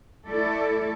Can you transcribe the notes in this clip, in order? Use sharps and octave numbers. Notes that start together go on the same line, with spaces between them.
A3 E4 A4 D5